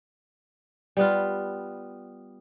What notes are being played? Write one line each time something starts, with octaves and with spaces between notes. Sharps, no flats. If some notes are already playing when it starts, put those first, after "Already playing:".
G3 B3 F4